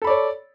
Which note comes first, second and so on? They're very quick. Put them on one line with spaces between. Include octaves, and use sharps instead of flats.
A4 B5 D5 C#5